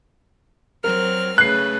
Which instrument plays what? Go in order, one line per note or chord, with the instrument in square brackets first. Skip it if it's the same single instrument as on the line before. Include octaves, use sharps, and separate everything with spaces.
[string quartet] F#3 C4 F6 [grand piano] A#4
[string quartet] C#3 A3 B4 [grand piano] F#6 C7